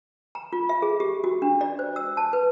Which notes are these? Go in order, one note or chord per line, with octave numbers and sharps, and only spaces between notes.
A#5
F4
E5
G#4
G4
F#4
D4
D5
C5
E6
A5
B4